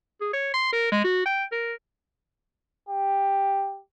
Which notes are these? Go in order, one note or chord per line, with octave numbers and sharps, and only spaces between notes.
G#4
C#5
C6
A#4
G#3
F#4
G5
A#4
G4